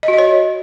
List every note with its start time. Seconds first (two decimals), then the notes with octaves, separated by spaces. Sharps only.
0.03 D#5
0.08 F#4
0.13 D#5
0.18 C#5